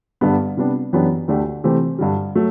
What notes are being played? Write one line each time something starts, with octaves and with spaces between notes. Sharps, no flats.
G2 D3 G3 B3
C3 G3 B3 D4
F#2 E3 B3 D4 G4
D2 D3 A3 D4 G4
C3 E3 A3 C4 G4
G2 D3 G3
F#3 A3